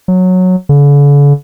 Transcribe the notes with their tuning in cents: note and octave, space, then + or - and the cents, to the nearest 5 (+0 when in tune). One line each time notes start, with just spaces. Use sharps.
F#3 -10
D3 -45